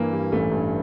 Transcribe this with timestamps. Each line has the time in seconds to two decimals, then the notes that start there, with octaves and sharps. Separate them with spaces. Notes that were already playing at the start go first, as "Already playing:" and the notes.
Already playing: G2 E3 A#3
0.12 G3
0.32 A1 A3
0.52 G2